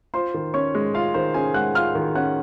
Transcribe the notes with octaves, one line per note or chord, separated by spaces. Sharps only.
F4 C5 C6
D#3
C#4 C#5 C#6
G#3
F4 F5
D#3 C5
C#4 G#4 G#5
G#3 F#5 F#6
F4 F5 F6
D#3
C#4 F#5 F#6